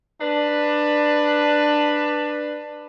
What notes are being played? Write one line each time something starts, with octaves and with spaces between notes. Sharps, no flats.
D4 B4